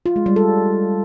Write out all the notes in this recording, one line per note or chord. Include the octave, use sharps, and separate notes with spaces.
F4
G#3
G3
A4